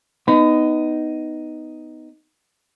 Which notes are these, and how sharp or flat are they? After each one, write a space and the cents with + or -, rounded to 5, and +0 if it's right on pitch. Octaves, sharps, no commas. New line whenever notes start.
B3 +15 D#4 +0 B5 +40